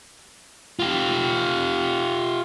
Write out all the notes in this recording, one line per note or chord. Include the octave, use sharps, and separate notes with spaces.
F4 G4